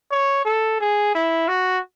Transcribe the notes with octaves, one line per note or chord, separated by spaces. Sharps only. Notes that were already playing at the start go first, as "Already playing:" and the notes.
C#5
A4
G#4
E4
F#4